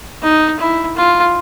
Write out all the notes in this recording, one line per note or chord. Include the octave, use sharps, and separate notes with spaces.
D#4
E4
F4